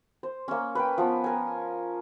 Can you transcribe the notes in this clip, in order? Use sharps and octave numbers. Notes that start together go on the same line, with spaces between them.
C5
A#3 C#4
B4 G5
F3 B3
A#4 G#5